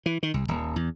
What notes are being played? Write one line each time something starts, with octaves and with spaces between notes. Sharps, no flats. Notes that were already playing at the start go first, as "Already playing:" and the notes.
E3
D#3
C2
D#1
E2